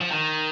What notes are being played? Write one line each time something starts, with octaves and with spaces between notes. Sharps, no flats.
F3
D#3